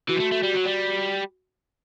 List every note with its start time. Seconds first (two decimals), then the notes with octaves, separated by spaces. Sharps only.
0.09 E3 F#4
0.16 G3
0.20 A3
0.32 A3
0.43 G3
0.55 F#3
0.66 G3